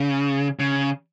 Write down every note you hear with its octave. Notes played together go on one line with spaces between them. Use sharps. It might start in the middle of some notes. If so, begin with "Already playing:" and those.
Already playing: C#3
C#3